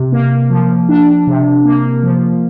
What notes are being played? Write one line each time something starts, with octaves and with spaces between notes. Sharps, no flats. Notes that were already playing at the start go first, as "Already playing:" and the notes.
Already playing: C3
A#3
F3
D4
C3
A#3
F3